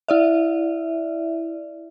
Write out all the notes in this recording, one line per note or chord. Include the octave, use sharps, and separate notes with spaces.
E4 D5 E5